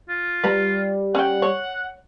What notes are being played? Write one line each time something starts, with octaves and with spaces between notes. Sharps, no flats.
F4
G3 B4 A#5
C#4 F#5 G5
C#5